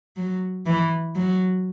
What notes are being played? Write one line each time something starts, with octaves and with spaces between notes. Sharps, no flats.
F#3
E3
F#3